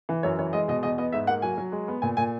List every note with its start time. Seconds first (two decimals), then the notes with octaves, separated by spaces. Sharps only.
0.09 E3
0.23 F#2 C#5
0.39 E3 C#5
0.53 G#3 D#5
0.68 B2 D#5
0.83 E2 D#5
0.98 B3 D#5
1.12 G#2 E5
1.27 A#3 F#5
1.42 F#3 G#5
1.58 F#3
1.72 G#3
1.88 B3
2.02 A#2 G#5
2.17 A#2 G#5